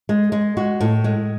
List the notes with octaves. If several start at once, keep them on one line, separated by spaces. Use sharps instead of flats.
G#3
G#3
G#3 F#4
A2
G#3